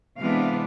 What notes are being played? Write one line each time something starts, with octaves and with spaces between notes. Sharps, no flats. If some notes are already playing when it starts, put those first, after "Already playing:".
C3 E3 G#3 B3 D4 F5